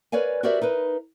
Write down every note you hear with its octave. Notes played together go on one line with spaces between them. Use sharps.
A#4 B4 C#5 D5 F5 G#5
F#4 G4 A#4 C5 D5 E5
D#4 A#4 B4